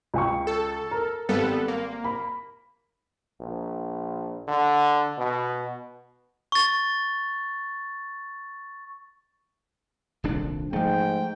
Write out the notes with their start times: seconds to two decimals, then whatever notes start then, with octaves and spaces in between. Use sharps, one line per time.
0.14 C#2 G5 C#6
0.47 A4
0.91 A#4
1.29 G#1 G3 B3 A4
1.68 A#3
2.04 B5
3.40 A#1
4.48 D3
5.18 B2
6.52 C#6 A6
10.24 D#1 C2 D4
10.73 G#2 F3 A3 G5